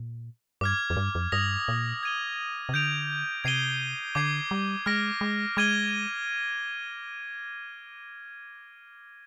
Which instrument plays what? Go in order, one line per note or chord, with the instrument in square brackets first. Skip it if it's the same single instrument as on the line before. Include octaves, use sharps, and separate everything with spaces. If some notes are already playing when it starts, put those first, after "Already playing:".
Already playing: [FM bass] A#2
[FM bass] G2 [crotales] D6 F6 G#6
[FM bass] F2
G2
F2
[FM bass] G2 [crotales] D#6 A#6 F7
[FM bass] A#2
[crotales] G#6 D#7 G7
[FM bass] C3
[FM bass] D3 [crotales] G6 D7 F7
[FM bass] C3 [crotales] G#6 C7 D#7 G7
[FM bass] D3 [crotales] D6 G#6 C7
[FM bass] G3
[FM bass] G#3 [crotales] F6 A#6 D7
[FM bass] G#3
[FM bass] G#3 [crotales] D6 G#6 D#7 G7